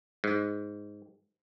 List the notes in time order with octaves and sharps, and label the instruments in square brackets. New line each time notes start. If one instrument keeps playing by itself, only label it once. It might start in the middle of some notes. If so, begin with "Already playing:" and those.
[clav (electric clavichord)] G#2